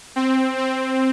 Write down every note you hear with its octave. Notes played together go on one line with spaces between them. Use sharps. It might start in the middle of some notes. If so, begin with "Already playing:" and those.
C4
C4